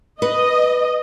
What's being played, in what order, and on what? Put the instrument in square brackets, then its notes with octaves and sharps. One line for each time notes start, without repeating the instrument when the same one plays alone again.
[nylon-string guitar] B4 [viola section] D#5